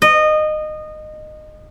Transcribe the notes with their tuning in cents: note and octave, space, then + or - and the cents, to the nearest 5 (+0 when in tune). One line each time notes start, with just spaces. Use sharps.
D#5 -20